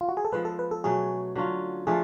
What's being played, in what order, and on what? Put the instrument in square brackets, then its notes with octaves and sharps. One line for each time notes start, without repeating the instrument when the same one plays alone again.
[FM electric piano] F4
F#4
G#4
A4
[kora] F3 G#3 B3 [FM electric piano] B4
[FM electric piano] A4
B4
A4
[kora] B2 F#3 A3 C#4 [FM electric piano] G#4
[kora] D3 F#3 C#4 F4
[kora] D3 F3 A3 F4 [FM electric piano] G#4